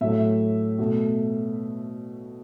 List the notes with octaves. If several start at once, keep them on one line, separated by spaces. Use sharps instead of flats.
A2 F#3 A3 E5
B2 A3